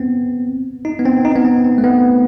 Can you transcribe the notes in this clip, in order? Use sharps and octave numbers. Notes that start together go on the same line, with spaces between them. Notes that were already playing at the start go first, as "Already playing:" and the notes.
Already playing: B3 C4
D#4
B3
C4
D#4
B3
C4
C4
A3
B3